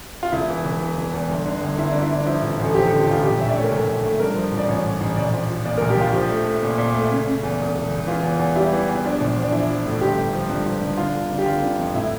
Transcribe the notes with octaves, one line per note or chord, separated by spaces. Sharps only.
F4
E1 E4
E3
E1
E3
E1
E2
G1
D3
G1
G1 E4
D3 D4
E4
G1
D4
F3 E4
A1
A1
A4
F3 G4
D3 A4
G4
A1 F4
A#1 G4
A#1 E5
D5
A3 C#5
A#4
A#1 A4
A#1
A3
G2 A#4
F3
A1
D5
A1 C#5
A1
A1
A#1 D5
F3
F3
A#2 D5
A#4
A#1
G4
A#1 F4
F3 G4
A3
A3
A#2
A#2
A3
C#3
C#3
E2
E1
E1
E1
E3 F4
E2
E2
G3 E4
E3
E2
F3 D4
A#1
F3
D4
F3 E4
F3
A2
G1 G4
G1
F3
G2
F3
G2
D3 F4
G1
D3
G4
G1 F4
D3
F2
A2 E4